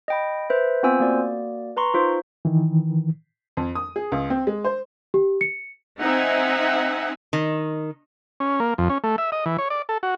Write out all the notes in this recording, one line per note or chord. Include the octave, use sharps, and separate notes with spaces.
D#5 G5 B5
B4 C5 E5
B3 C4 F4 C5 G#5 E6
A#3 F#4 D5
B4 A#5 C6 C#6
D#4 F4 C5
D#3 E3
F2
D#6
G#4
C#2
C4
G#3
C5
G4
C#7
C4 D#4 E5 F#5 G#5
D#3
C#4
A#3
F2
C#4
A3
E5
D#5
E3
C#5
D5
A4
F#4